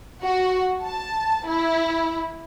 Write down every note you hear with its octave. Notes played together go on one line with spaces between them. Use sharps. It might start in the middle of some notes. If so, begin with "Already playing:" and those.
F#4
A5
E4